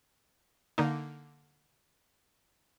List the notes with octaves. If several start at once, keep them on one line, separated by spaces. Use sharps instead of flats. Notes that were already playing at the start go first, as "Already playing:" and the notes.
D3 A#3 D#4